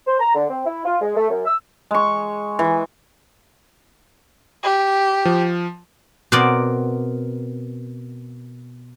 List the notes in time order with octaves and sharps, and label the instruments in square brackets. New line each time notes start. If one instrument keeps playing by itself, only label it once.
[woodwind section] C5
A#5
D3
C4
E4
F4
G#3
A3
F#2
E6
[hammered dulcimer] G#3 C#6
E3
[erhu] G4
[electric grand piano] F3
[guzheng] B2 C4 A#4 D5